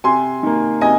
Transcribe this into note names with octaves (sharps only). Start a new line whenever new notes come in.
C3 G#5 C6
D#3 A#3
C3 D#5 G#5